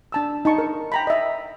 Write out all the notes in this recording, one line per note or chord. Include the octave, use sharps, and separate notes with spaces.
D4 A5 E6
D#4 A5 C#6
A#4
G5 A#5 B5
D#5 E5